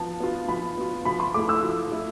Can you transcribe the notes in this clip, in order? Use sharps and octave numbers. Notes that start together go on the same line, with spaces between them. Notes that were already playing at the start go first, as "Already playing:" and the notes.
Already playing: F3 B3 A5
B3 F4
F3 B5
B3 F4
F3 B5
C6
A3 E4 D6
E6
F3
A3 E4